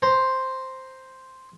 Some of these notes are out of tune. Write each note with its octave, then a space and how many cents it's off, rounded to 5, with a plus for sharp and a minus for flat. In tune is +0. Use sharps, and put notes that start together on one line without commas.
C5 +0 A#5 +0